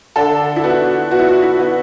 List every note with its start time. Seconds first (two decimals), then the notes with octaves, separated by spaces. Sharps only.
0.16 D3 A4
0.56 E4
0.64 B3 F#4
1.11 B3 F#4
1.19 E4
1.28 F#4
1.42 E4
1.59 B3